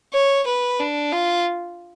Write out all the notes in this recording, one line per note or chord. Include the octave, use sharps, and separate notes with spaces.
C#5
B4
D4
F4